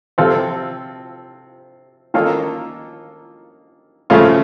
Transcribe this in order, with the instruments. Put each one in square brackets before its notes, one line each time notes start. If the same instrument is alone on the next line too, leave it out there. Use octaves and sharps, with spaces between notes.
[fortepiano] C3 F3 C4 F4 A4
D#3 A#3 C#4 F4 A4
C#3 F3 A3 C#4 F4